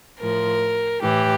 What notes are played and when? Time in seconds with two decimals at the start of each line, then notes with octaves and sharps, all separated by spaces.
0.20 A2 F3 A#4
1.02 A2 E3 G4